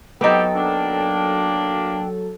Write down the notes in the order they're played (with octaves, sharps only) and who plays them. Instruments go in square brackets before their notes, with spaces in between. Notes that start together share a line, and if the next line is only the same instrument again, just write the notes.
[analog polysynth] F#3 A4 [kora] B3 D#4 [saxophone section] C4 G4 [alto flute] G5
[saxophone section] A#3 D4